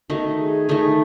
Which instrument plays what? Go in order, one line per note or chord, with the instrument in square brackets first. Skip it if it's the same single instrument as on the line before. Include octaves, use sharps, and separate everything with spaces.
[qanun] D#3 A3 D#4 [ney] F#4
[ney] G#4
[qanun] D#3 A3 D#4